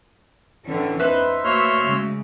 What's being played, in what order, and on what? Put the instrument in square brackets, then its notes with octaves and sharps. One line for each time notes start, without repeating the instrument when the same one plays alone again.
[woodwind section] A2 D3 [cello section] E3 C#4 D4
[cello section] E2 D#4 [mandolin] B4 C5 [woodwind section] E5
[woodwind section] A3 A#3 F#4 [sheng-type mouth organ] C#5 C6 F6 [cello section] E5
[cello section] C#3 G#3